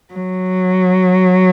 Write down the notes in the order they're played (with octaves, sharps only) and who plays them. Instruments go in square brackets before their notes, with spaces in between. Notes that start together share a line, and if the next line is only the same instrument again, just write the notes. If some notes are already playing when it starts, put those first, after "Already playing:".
[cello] F#3